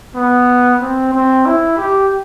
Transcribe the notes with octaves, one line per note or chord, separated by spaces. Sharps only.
B3
C4
C4
E4
G4